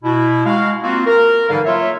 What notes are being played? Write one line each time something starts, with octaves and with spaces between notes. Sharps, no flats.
B2 E4
G#3 F#4 F5
A#3 C4 F4 F#4
A#4
G#2 D3 E3 G3 A4 F5
F#3 A#3 F4 C#5 E5